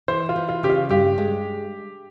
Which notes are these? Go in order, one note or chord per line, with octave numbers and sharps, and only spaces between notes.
E3 C5
F4
E3
F4
C#3 G4
F4
G2 G4
G#3